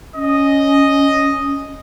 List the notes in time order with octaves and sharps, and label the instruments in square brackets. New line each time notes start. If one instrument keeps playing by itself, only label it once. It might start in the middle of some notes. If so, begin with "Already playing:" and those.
[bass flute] C#4 [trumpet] D#5